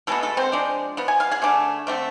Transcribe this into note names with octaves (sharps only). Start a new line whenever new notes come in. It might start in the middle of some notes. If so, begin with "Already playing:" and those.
B2 G#3 A3 B3 A4
A3 A4
C4 C5
F3 G#3 D4
F3 B3
G#5
F5
G#4 G#5
D3 A3 D4
D3 A3 C4